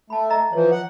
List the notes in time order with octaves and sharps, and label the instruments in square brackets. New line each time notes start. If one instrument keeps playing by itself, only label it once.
[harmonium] A3 [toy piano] A5 B5
[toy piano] D#5 E5 A#5
[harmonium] E3 F3 [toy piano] C#5
[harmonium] F#5